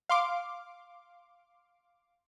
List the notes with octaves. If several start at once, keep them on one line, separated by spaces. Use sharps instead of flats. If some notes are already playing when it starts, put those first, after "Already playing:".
F5 C6 D6